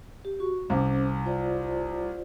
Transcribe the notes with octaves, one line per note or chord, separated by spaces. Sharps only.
G4
F#4 C#6
C2 C#4 C5 D6
F4 C5 D5